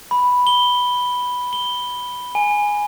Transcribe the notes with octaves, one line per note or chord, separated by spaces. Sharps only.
B5
G7
G7
G#5